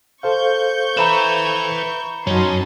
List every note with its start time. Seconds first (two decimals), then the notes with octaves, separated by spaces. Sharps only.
0.23 A4 C5 F5 C#6 G6
0.97 B4 E5 A#5 B5 E7
2.27 F#2 F#3 C#4 D#4 A5 C6